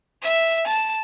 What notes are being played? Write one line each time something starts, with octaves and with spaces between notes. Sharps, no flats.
E5
A5